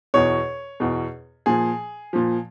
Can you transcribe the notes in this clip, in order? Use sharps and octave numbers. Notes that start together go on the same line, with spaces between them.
E2 B2 C#5
E2 B2
A#2 F3 G#4
A#2 F3